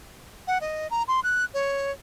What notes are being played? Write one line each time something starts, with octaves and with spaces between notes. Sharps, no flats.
F#5
D#5
A#5
C6
F#6
C#5